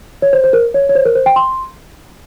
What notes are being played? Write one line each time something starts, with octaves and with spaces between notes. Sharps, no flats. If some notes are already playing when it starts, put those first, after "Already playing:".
C#5
C5
C5
A#4
C#5
C#5
C5
A#4
C5
G5
C6